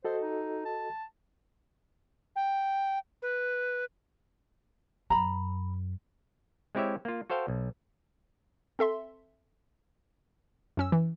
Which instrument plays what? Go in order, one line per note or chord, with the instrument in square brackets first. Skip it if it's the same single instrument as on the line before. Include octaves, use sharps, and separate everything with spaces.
[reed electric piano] F#4 A4 D#5 [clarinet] C5
[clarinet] D#4
A5
[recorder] G5
B4
[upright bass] F#2 [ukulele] A#5 B5
[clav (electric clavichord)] G#3 C4 E4 G4 C#5 E5
A#3 F4
F#4 A4 C5 F5 G5
B1
[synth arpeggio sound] C4 A4 E5 C6
F#2 C#4 E6
E3